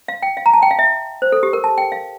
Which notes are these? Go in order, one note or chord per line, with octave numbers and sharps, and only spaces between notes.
F5
G5
F5
A#5
A5
G5
F5
E5
C5
A4
G4
A#4
A5
G5
F5